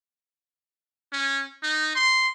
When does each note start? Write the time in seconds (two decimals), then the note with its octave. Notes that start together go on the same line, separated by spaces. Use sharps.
1.12 C#4
1.62 D#4
1.95 C6